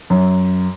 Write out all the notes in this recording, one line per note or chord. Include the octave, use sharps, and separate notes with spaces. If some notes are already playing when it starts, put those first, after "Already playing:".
F#2